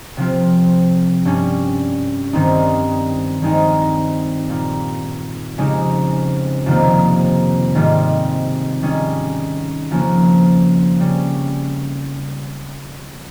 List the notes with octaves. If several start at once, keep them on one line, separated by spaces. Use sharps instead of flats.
C3 F3 C4 F4
G2 G3 C#4
G2 D#3 G3 C4 D#4
G2 D#3 G#3 C4 D#4
A#2 G3 A#3
F2 C#3 G#3 D#4 G4
F2 C3 D#3 G3 A#3
G#2 D#3 G3 C4 F4
D#3 G3 C#4 G#4
F2 C#3 F3 A#3 C#4
C#3 G3 C#4